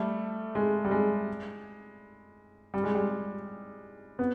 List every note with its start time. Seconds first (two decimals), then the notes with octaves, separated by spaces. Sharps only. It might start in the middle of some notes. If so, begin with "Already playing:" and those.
Already playing: G3 A3
0.55 G#3
0.85 G3
0.91 G#3
2.74 G3
2.84 G#3
2.95 G3
4.19 B3